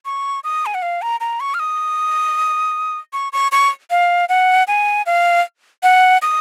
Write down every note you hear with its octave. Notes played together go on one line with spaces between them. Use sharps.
C#6
D#6
G#5
F#5
F5
A#5
A#5
C#6
F6
D#6
C#6
C#6
C#6
F5
F#5
G#5
F5
F#5
D#6